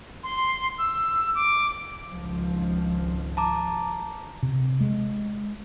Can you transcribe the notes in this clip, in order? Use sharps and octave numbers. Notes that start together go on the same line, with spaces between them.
C6
E6
D6
G#1 C#2 F3
A5 A#5 D6
C3
G#3